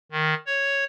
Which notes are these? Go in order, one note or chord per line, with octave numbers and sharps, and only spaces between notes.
D#3
C#5